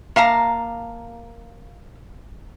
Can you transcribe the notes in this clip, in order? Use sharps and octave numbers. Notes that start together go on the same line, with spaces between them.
A#3 F5 A5 A#5